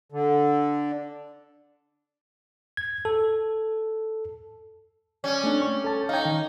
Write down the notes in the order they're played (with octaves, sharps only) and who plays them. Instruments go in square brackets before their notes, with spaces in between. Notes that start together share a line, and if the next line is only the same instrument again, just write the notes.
[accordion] D3
[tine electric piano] G#6
A4
[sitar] G3 C#4
[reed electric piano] A3 C4 D4
C#6
A4 A5
[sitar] D#4 C#5 [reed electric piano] F5 G5
[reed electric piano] D#3